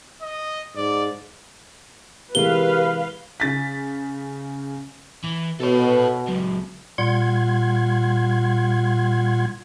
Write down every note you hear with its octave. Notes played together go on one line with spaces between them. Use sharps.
D#5
G#2 D5
C3 E3 G#3 G4 A#4 B4 F5 G7
C#3 A6 B6
E3
B2 A4 C#5
C#2 F#3
A#2 G3 F4 F#5 C6 G#6